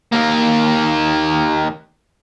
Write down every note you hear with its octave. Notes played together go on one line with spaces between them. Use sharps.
D#2 A#3